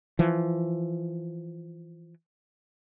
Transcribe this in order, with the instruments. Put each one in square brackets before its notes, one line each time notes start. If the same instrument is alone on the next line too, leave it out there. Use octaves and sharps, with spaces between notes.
[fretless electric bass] E3 F3